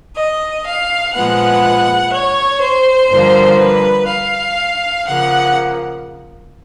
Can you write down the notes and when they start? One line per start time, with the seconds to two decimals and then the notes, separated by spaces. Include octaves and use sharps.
0.16 D#5
0.65 F5
1.13 A#2 F3 G#3 B3 F#5
2.13 C#5
2.61 C5
3.10 G2 D3 F3 A#3
3.59 B4
4.07 F5
5.06 C#3 F3 A#3 F#5